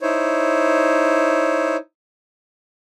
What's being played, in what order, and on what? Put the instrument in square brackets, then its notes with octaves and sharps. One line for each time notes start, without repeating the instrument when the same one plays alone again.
[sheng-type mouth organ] D#4 E4 C5 C#5